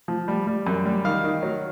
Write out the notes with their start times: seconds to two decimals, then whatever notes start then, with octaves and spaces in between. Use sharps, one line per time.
0.08 F3
0.28 G3
0.47 G3
0.67 F#2
0.86 G3
1.05 D#3 F5
1.24 D#3
1.43 F#3